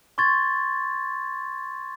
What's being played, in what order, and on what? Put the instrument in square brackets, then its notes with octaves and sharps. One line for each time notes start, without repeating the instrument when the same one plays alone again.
[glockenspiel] C6 C#6 G#6 A6